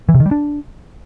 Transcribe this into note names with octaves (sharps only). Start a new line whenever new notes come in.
E3
C3
D#3
G3
D4